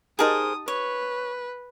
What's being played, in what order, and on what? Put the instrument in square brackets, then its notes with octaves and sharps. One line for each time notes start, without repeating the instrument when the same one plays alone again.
[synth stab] D#4 G4 A5 [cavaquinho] G#4 A#4 C5 [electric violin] D#6
[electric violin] B4 [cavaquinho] C#5